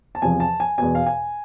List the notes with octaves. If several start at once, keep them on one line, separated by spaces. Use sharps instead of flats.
A5
E2 C3 F3 G#5
A5
G#5
E2 B2 G#5
F5
G#5